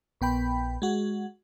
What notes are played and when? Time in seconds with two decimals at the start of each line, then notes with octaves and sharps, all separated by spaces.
0.21 A#1 B3 G5 B5
0.82 G#3 F#4